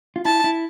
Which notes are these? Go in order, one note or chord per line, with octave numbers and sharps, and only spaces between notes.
F4
E4 A5
E4